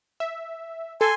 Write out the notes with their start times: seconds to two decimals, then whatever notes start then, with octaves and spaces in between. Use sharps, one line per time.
0.20 E5
1.01 A4 G#5 C6